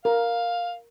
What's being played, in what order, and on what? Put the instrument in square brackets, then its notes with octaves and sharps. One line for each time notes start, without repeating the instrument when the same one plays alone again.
[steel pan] A#4 [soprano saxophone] F5